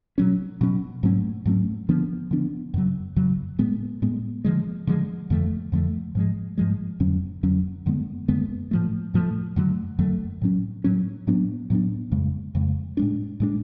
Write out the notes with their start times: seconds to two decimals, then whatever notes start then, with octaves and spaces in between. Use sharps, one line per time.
0.18 B2 F#3 C#4
0.61 B2 F#3 C#4
1.03 G#2 F#3 A3 C#4
1.45 G#2 F#3 A3 C#4
1.89 D3 F3 B3 D4
2.31 D3 F3 B3 D4
2.74 F#2 C#3 F#3
3.16 F#2 C#3 F#3
3.59 A2 G#3 B3
4.02 A2 G#3 B3
4.45 D3 F3 G#3
4.87 D3 F3 G#3
5.30 F2 D3 F3 A3
5.72 F2 D3 F3 A3
6.15 G#2 F3 G#3
6.58 G#2 F3 G#3
7.00 F2 D3 F#3 C#4
7.43 F2 D3 F#3 C#4
7.86 F#2 D3 G#3 B3
8.28 F#2 D3 G#3 B3
8.71 A2 F3 A3
9.14 A2 F3 A3
9.56 F#2 D3 F#3 A3
9.99 F#2 D3 F#3 A3
10.42 A2 F#3 C#4
10.84 A2 F#3 C#4
11.27 A2 F#3 B3 D4
11.70 A2 F#3 B3 D4
12.12 F2 C#3 G#3
12.55 F2 C#3 G#3
12.97 A2 G#3 D4
13.40 A2 G#3 D4